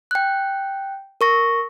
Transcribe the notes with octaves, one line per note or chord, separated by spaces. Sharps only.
G5 F#6
A#4 C#6 A#6